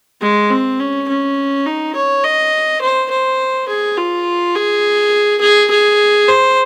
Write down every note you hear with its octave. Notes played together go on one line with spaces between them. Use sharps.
G#3
C4
C#4
C#4
D#4
C#5
D#5
C5
C5
G#4
F4
G#4
G#4
G#4
C5